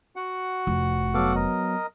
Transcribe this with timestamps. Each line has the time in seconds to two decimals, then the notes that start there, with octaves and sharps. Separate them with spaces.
0.16 F#4 F#5
0.67 F1
1.14 F#3 B3 A4 F5 D6
1.35 A#4 D#5